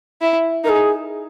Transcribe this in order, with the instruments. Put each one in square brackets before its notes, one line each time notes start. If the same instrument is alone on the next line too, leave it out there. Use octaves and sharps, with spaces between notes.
[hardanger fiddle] E4
[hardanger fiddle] D#4 [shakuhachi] A#4
[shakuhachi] G#4